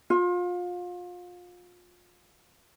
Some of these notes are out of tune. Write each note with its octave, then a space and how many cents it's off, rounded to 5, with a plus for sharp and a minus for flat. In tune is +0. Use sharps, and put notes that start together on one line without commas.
F4 +30